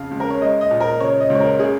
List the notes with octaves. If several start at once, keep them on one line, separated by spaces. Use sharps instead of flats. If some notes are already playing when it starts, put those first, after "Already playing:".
Already playing: F2 C#3 F5
C#2
A#4
C#5
G#3 D#5
D#5
A#2
A#4
C#3 C#5
D#5
C#2
C#5
A#4
C#3 G#4